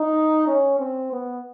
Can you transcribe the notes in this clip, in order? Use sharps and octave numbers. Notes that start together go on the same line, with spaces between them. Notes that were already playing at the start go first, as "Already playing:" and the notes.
Already playing: D#4
C#4
C4
B3